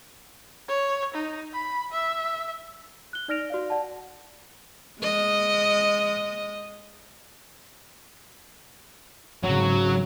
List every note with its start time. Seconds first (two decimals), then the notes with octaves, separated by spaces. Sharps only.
0.68 C#5
1.14 D#4
1.53 B5
1.92 E5
3.13 F#6 G7
3.28 D#4 D5 F6 A#6 D7 F7
3.50 F#4 D5 F5
3.70 D5 F#5 A5
5.00 G#3 D#5
9.44 G#1 C#3 F#3